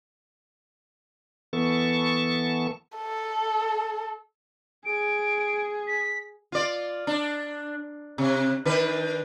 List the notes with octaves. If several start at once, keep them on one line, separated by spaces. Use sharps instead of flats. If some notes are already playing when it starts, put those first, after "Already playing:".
E3 B3 A4 A5 C#6
A4
G#4 D7
B6
F4 D5
D4
C3
D#3 D4 B4